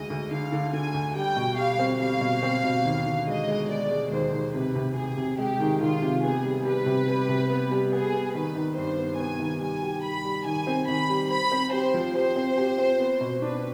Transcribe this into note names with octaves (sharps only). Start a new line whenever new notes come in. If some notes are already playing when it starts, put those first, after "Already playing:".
Already playing: D2 D3 G#3 D#5
D2
D3 F5
D3
D3 G#5
D2
G3 G5
B2
G3 F5
C4
G3 F5
B2
C4
B2
D#2
D3
G#3 D#5
G#3
G#3 D5
G#3
D#2 C5
D#2
C3 B4
C3
C3 G#4
C3
G#3 G4
D#3
D#3 F4
C3
B3 G#4
G3
G3 B4
C3
G3
C3
B3
G3
B3 G#4
B3
D#3 B4
D#3
G2 C5
B3
B3 G#5
D#3
G3 G#5
G4
G3 B5
G3
D#3 G#5
C4
D#3 B5
G3
C5 B5
C4
G4 C5
F3
G4 C5
C4
G4
C4
B3
B2
D4 B4